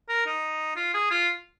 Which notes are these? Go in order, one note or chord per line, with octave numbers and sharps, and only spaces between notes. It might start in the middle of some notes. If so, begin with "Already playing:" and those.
A#4
D#4
F4
G#4
F4